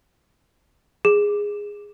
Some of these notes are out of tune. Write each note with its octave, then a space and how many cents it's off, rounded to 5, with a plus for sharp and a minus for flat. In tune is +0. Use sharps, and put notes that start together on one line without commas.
G#4 -10